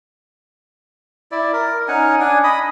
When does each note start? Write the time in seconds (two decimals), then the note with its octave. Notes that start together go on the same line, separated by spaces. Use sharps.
1.32 E4 D5
1.53 A#4
1.88 C#4 D#4 F#5 G#5
2.20 D4 G#5
2.44 D#5 B5 D#6